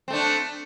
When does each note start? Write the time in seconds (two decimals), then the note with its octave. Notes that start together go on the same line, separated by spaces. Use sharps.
0.08 C4
0.10 A3
0.13 D4